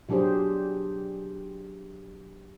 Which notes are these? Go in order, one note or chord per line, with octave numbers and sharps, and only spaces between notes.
B2 F#3 D4 G4 G#4 C5